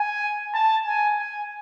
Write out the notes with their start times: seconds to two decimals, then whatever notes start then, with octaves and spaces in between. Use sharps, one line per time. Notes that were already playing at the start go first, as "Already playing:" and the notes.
Already playing: G#5
0.54 A5
0.86 G#5
1.19 G#5